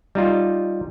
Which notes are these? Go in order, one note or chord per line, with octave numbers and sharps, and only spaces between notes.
G3 D#4 F4